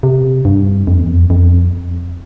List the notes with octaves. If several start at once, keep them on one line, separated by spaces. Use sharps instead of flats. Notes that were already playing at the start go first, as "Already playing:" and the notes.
C3
G2
F2
E2
F2
F2